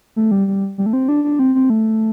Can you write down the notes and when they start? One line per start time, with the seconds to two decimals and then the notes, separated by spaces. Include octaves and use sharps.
0.16 A3
0.31 G3
0.47 G3
0.78 G3
0.86 A3
0.93 C4
1.08 D4
1.24 D4
1.39 C4
1.55 C4
1.70 A3